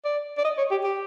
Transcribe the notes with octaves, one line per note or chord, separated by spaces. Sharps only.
D5
D5
D#5
C#5
G4
G4